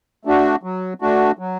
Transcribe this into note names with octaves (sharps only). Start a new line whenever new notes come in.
A3 D4 F#4
F#3
A3 D4 F#4
F#3